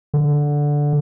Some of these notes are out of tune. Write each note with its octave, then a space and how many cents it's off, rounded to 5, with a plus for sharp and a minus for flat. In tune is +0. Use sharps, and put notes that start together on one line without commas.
D3 -5